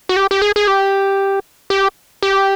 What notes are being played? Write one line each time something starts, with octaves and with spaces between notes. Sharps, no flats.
F#4
G4
G4
G#4
G#4
G4
G4
G4